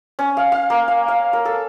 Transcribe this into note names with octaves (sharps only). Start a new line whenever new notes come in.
C#4
F5
F5
A#3
F5
F5
A#4
A4